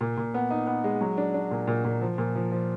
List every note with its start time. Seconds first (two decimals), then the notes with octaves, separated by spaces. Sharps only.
0.01 A#2
0.17 A#2
0.34 B3
0.50 D#4
0.67 B3
0.84 G#3
1.01 F#3
1.18 D4
1.34 D4
1.51 A#2
1.67 A#2
1.84 A#2
2.02 F3
2.18 A#2
2.35 F3
2.51 F3